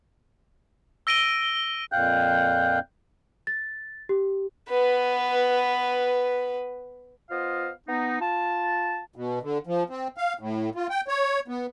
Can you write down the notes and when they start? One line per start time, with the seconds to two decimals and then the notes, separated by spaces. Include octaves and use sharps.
1.07 E6 A#6 D7 D#7 G7
1.92 F2 A#2 F5 G5 F#6 G6
3.47 A6
4.09 G4
4.70 B3 B4
7.31 B3 F4 C5 D#5 F5
7.88 B3 D#4
8.21 F4 A5
9.16 B2
9.42 D3
9.67 F3
9.90 C4
10.17 F5
10.39 A2
10.75 F4
10.90 G5
11.08 C#5
11.48 B3